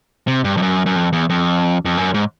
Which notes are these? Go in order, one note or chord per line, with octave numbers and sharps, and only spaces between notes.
C3
G2
F2
F#2
F#2
F2
E2
F2
F2
F#2
G#2